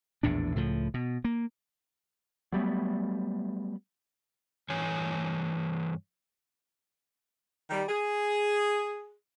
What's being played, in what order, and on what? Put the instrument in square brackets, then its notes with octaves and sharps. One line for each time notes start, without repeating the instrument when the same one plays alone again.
[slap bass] A#1 E2 A2 D4
C#2 A2 F3
B2
A#3
[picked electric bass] F#3 G3 A3 B3
[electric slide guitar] G2 E3 C#5 G#5
[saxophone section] D#3 G3
G#4